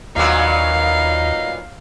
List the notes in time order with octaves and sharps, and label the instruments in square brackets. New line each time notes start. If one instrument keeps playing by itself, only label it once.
[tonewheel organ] D#2 [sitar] A#2 F#3 B3 [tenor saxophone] D#4 [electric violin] F5